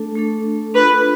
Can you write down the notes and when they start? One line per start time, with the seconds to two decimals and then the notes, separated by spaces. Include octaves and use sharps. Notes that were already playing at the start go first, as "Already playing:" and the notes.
Already playing: A3 D4 A4
0.16 A3 D4 A4
0.74 D4 F4 A4 B4